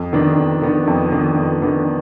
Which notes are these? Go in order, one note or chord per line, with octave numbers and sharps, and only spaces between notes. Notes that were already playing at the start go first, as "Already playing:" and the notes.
Already playing: F2
D#3 B3 D4
F2
D#3 B3 D4
F2
D#3 B3 D4
F2
D#3 B3 D4